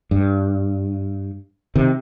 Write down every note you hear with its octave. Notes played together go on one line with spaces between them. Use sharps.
G2
C3 D#3